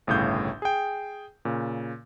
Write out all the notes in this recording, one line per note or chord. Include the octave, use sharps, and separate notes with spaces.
G1 C2 A2 C#3 F5 G6
G#4 G5
A#2 C#3